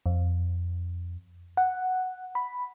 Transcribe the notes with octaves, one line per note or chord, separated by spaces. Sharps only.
F2
F#5
B5